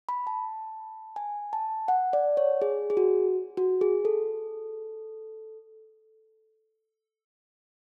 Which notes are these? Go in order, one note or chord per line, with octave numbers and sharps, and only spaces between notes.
B5
A5
G#5
A5
F#5
D5
C#5
G#4
G#4
F#4
F#4
G#4
A4